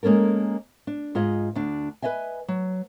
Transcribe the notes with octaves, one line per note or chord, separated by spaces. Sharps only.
G#3 A#3 C#4 A4 A#4
D4
G#2 F4 G#4 D#5
D2 D4
B4 C#5 D#5 E5 G#5
F#3